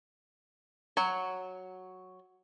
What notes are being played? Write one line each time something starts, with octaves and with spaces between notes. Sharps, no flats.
F#3 C#5